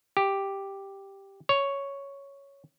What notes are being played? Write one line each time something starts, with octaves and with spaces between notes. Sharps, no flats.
G4
C#5